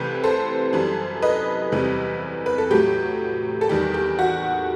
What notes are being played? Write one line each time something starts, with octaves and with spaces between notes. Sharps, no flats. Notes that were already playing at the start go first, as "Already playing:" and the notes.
Already playing: C2 C3 E3 A3 G4 B4
A4 C5
F#2 E3 G3
B4 D#5
E2 C3 E3 G3
B4
A4
A2 F#3 A3 G4
A4
E2 D#3 G3 G4
G4
F#4